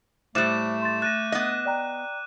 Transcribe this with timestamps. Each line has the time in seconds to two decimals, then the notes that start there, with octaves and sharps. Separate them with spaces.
0.35 A2 G3 A3 C5 D6 F#6 E7
0.82 C6 A6
1.02 F#6 A6 A#6 D#7
1.32 B3 D#5
1.66 D5 G5 A#5